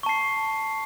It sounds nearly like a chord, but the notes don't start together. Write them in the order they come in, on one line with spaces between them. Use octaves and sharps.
C#6 A5 C7